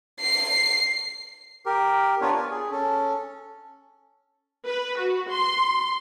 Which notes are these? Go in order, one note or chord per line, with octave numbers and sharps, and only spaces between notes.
C7
G4 A#4
B3 D4 F4 A#4 B4 C#5
D5 G#5
G#4
C#4 A4
B4
F#4
C6